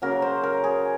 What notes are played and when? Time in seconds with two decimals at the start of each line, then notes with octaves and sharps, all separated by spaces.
0.02 C#3 F#3 A#3 A#4
0.22 C5
0.43 A#4
0.64 G#4